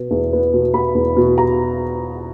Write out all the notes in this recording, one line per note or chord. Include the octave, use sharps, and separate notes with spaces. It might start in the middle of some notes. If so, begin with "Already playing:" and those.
Already playing: B2 B3
E2
B3
B2
B3 B5
E2
B2
A#5